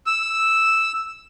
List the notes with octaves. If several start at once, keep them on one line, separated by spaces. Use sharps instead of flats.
E6